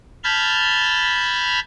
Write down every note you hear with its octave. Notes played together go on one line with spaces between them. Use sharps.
A5 B5 F6 G6 G#6